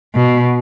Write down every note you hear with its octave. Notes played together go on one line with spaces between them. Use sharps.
B2